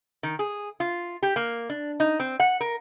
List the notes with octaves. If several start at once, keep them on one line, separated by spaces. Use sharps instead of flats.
D#3
G#4
F4
G4
A#3
D4
D#4
C4
F#5
A#4